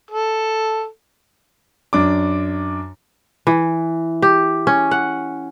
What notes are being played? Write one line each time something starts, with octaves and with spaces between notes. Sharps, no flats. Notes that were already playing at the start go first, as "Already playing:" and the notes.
A4
F#2 D4 D6
E3
G4
C#4
F#5